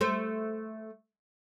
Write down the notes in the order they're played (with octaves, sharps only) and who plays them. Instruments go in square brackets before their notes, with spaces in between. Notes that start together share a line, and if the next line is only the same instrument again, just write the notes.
[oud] A3 C5